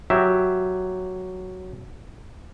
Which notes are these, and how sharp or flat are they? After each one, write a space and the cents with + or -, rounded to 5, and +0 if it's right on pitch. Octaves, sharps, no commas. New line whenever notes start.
F#3 +0 G4 +0 E5 +0